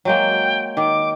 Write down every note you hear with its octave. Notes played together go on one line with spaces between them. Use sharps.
F#3 G#3 A#3 G5
D#3 D6